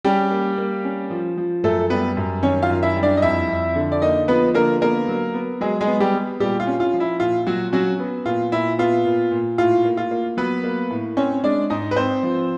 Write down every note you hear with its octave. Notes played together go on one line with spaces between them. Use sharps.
G3 C#4 G4
A#3
A#3
C#4
F3
F3
F#2 A3 A4
G3 B3 B4
F#2
D#3 C#4 C#5
F4 F5
F#2
E4 E5
G3
D4 D5
D#5
F2 E4 E5
F2
D3
D5
A#3 D#4 D#5
F3 B3 B4
D3 A#3 A#4
A#3 B3 A#4
F#3
B3
F#3 G#3 G#4
G#3 G#4
B3
G3 G4
B3
A#2 G3 G4
F4
C#4
F4
F3
E4
A#2 F4
A#2 F#3 F#4
F#3 C#4 F#4
B3
A#2 F4
A#2 E4
B3 F4
A#2
A#2
A2 F4
A#3
F4
A#3
F#3 B3 B4
A#3
A2
C4 C#4 C#5
G#3 D4 D5
G#2 D#4 D#5
B4
C4 C5
F3